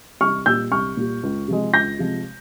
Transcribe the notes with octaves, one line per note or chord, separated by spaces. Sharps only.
C2 C#6 F6
A#2 G3 E6 G6
C2 C#6 F6
A#2 G3
C#2
C3 F3 G#3
C#2 G6 A#6
C3 F3 G#3